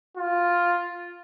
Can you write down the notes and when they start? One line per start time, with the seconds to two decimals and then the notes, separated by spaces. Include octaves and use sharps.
0.17 F4